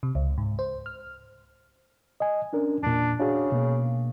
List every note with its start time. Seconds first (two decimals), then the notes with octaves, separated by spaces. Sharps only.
0.03 C3
0.15 C#2
0.38 G#2
0.59 C5
0.86 F6
2.20 D#5 G#5
2.53 C#4 D4 A#4
2.83 E2 A#2 D4
3.20 C#3 D4 F#4 G#4
3.52 B2 A#3